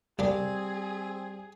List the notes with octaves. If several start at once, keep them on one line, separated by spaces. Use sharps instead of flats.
C2 G3 C4 D4 G#4